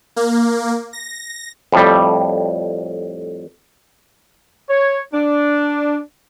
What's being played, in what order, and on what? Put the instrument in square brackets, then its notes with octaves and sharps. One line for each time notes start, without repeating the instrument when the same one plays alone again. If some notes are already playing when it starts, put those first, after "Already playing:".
[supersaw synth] A#3
A#6
[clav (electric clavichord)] F2 A2 G3
[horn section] C#5
D4